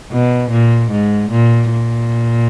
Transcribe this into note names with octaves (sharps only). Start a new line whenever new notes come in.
B2
A#2
G#2
A#2
A#2